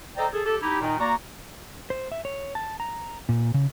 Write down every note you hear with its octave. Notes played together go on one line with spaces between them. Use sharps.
A4 C5 D5 D#5 G5 A#5
G#4 A4
G4 A4
D#4 E4 G4
A#2 D#3 D#4
A#3 F#4 D5 A#5
C5
E5
C#5
A5
A#5
A#2
C#3